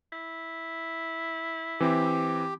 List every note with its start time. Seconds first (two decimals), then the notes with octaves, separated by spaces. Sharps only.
0.12 E4
1.80 E3 C4 G4